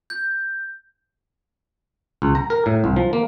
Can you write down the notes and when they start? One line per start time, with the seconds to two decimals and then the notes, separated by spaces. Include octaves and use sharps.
0.10 G6
2.22 C#2
2.35 A#5
2.50 A#4
2.66 A2
2.84 C2
2.96 F3
3.13 A#3